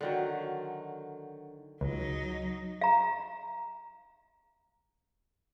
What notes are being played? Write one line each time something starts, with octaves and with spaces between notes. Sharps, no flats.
D3 D#3 F#3
C#2 F#3 D#4
F5 A#5